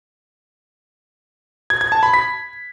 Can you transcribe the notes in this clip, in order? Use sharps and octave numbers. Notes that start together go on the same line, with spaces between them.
G#6
G#6
A5
B5
B6